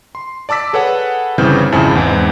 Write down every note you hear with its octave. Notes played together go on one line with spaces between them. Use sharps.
C6
D5 A5 D6 E6 B6
G#4 A4 B4 C#5 F#5
G1 C#3 E3 C4 F6 G6
G#1 F2 C#3 E4 G#5
E2 G#2 E3 C4